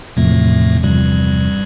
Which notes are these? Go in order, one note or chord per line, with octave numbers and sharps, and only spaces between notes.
E1 E2 A2 C3 F3 A3
E1 E2 G2 C3 F3 G3